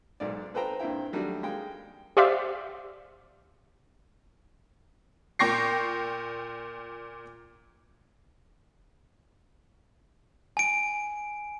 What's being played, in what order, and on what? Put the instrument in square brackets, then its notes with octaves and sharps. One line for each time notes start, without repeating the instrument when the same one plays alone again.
[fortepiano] B1 G#2 D5
A4 B4 C5 G5 A#5
G2 A#2 C4 E4 G5
D#3 F#3 G3 A3 D4
G#3 A#3 G5
[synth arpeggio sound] G4 C5 D5 E5 F5
[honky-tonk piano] A#2 G5 C#6 A#6 C7
[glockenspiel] G#5 D7